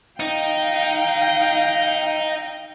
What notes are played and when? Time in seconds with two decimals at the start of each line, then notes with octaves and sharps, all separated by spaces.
0.20 D#4 F5 G5